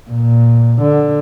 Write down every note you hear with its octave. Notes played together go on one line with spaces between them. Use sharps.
A#2
D3